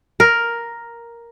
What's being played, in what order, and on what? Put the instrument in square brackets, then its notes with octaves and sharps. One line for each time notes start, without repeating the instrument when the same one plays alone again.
[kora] A#4